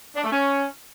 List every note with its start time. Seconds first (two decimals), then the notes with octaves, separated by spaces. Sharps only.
0.16 D4
0.24 A3
0.32 C#4